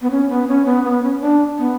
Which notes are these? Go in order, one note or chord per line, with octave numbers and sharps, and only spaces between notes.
B3
C#4
B3
C#4
B3
B3
C#4
D4
B3